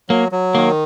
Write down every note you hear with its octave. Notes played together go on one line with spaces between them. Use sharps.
F#3 A#3
F#3
D#3 A#3